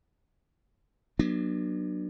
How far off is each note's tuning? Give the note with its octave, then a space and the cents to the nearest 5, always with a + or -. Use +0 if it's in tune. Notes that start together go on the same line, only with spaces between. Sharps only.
F#3 +0 B3 -40 D4 +20